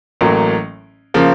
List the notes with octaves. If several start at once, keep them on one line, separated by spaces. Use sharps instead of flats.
A1 A2 F#3 A#3
C#3 F3 A#3